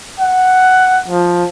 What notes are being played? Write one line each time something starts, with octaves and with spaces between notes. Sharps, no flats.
F#5
F3